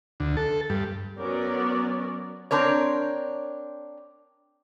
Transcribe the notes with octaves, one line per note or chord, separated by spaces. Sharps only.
D2
A4
G2
F#3 B3 C#4 A#4 D5
C4 D4 A#4 C#5